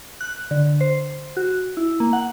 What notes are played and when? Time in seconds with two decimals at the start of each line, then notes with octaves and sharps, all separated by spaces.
0.21 F#6
0.51 D3
0.81 C5
1.37 F#4
1.77 E4
2.00 A#3
2.13 F#5